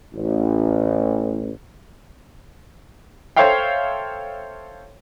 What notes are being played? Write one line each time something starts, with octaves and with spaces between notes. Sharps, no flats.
A1
A4 C5 C#5 E5 F5 G5